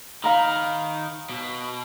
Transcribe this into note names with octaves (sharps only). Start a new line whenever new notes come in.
D#3 F5 A#5 B5
B2